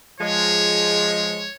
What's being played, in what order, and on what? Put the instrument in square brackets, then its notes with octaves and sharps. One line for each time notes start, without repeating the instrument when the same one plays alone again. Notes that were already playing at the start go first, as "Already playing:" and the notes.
[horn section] F3 G#3 [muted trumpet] C#5